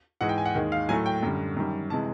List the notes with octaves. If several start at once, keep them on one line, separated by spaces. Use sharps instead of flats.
G#2 E3 G#3 F#5
G5
G#5
F#5
D#2 D#3 G#3
F5
A2 F#3 A3 G#5
G5
F#2 D3 G3
F#2 D#3 G3
C3 E3 G#3 A5